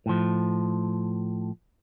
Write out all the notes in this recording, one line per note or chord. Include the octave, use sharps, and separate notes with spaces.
A2 F3